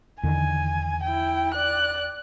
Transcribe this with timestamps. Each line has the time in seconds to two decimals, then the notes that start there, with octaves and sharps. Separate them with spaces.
0.23 E2 D3 D#3 G#5
1.04 E4 G5
1.55 D5 F#6